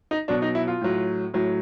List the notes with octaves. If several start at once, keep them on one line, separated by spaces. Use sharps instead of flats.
D#4
B2 F#3 D4
D#4
E4
F4
A2 F#3
A2 F#3